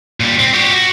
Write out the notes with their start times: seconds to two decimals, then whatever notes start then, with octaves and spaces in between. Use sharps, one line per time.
0.20 A#2 G3
0.39 C4
0.53 F#4 G4
0.73 F#4